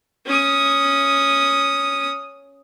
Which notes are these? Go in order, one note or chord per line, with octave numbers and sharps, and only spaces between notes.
C#4 D#6